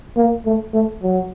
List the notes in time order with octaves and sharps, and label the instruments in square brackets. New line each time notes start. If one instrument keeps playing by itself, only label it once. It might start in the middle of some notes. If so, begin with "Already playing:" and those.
[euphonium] A#3
A3
A3
F#3